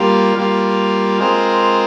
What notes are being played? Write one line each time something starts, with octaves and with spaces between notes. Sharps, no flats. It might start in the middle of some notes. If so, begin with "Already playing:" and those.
Already playing: G3 A#3 F4
G3 A#3 F4
G#3 C4 F4 A#4